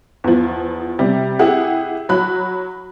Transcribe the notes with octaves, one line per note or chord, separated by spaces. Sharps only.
E2 F3
C3 G3
E4 G4 G#4 F#5
F#3 B5 F#6